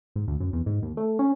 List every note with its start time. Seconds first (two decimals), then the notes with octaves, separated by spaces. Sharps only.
0.16 G#2
0.28 D2
0.40 F#2
0.53 E2
0.66 G#2
0.82 D#2
0.97 A3
1.19 C#4